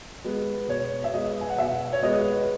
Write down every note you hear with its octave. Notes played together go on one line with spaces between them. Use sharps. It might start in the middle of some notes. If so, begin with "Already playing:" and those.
G#3 B3
B2 C#5
E5
G#3 B3 D#5
G#5
F#5
B2 E5
C#5
G#3 B3 D#5